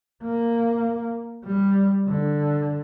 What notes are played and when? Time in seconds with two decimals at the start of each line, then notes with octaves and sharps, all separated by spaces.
0.24 A#3
1.46 G3
2.08 D3